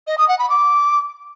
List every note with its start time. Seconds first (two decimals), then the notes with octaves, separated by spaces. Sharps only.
0.07 D#5
0.18 D#6
0.28 F#5
0.39 B5
0.50 D6